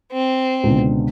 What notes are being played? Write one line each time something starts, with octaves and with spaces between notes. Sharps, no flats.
C4
C#2 B2 D3